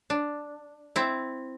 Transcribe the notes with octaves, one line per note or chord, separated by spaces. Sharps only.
D4
C4 E4